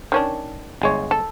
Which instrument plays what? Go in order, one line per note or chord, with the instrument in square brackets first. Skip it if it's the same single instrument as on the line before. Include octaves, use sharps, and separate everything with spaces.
[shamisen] D#3 C#4 D4
[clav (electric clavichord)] G1 G#3 C#5
[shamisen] A4